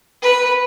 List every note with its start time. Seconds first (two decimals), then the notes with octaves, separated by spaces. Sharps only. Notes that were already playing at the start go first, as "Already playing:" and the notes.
0.22 B4